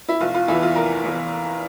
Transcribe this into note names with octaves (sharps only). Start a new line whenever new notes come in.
E4
F1 F4
F4
E2 E3 E4
F4
F1 A#4
E2 E3